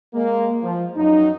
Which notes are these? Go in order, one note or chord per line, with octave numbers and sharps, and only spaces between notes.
G#3 A#3
F3
F#2 F#3 D#4